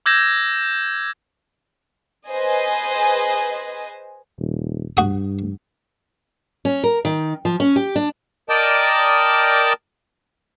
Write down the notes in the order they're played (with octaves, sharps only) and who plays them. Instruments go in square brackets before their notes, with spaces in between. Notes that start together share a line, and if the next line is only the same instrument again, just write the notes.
[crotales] D6 E6 G6 G#6 A#6 E7
[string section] G#4 B4 C5 D#5 G#5
[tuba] D#1
[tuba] G2 [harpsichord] F#4 D#6
[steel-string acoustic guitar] C#4
A#4
D#3
F3
C#4
G4
D4
[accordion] A#4 D5 D#5 G5 A5